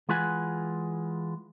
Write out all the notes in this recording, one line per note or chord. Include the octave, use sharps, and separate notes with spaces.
E3 G#3 F4 B4 F#5 G#5